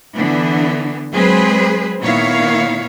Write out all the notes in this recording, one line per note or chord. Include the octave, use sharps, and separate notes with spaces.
D3 E3 B3 D4
F#3 G#3 C4 G#4 B4 C5
A#2 D#3 B3 E4 C#5 F5